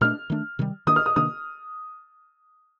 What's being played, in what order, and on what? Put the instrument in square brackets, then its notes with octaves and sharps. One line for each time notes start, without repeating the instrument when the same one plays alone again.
[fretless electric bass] A#2 A3 D4 [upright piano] F6
[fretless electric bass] D#3 A3 D4
C3 D#3 G3
[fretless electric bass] D#3 A#3 D4 [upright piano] D#6
[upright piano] F6
D#6
[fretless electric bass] C3 D#3 A#3 D4 [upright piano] D#6